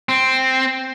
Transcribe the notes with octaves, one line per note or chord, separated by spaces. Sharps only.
C4